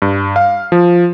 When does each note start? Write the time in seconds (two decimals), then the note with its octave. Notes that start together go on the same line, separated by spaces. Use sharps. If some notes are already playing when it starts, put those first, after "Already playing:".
0.02 G2
0.36 F5
0.72 F3